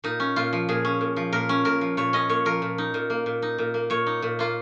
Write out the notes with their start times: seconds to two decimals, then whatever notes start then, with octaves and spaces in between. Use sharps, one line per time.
0.04 A#2 D#4
0.20 C#4
0.36 A#2 F4
0.53 F3
0.69 A#2 G#4
0.85 C#4
1.01 A#2
1.16 F3
1.33 A#2 A#4
1.49 C#4
1.65 A#2 A#4
1.81 F3
1.97 A#2 C#5
2.13 C#4 D#5
2.29 A#2 C#5
2.45 F3 A#4
2.62 A#2
2.78 D#4
2.94 A#2
3.10 A#3
3.26 A#2
3.42 D#4
3.58 A#2
3.74 A#3
3.90 A#2 C#5
4.06 D#4
4.22 A#2
4.39 A#3 F4